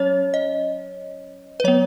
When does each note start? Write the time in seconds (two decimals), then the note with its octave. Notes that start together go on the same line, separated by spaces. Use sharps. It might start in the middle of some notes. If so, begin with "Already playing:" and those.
Already playing: F#3 C#4 C#5
0.34 D#5
1.60 B4
1.64 F#3 B3 C#5